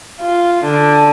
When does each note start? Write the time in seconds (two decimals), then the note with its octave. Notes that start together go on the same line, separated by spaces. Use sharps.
0.21 F4
0.64 D3